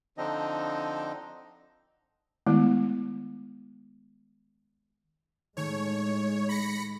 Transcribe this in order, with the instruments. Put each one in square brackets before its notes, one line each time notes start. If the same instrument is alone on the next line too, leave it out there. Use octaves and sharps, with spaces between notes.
[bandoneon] D3 F3 C4 D4 D#4 D#5
[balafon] D#3 G#3 A3 B3 E4
[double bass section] A2 G#3 [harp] D#3 A3 G#4 [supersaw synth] C#5
[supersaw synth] B5 A#6 C#7